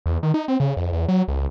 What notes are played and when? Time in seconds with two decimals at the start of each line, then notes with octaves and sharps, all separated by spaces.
0.06 E2
0.23 D#3
0.34 D#4
0.48 C4
0.60 C#3
0.77 F2
0.92 E2
1.08 F#3
1.28 C#2